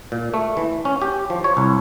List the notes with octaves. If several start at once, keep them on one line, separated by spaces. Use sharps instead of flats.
A#2
A3
E3
C#4
G4
F3
C#5
C2